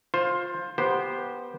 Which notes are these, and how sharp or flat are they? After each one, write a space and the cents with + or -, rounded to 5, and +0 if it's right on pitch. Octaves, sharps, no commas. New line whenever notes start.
F4 +15 C5 +15
B3 -15 G4 +0 C5 +0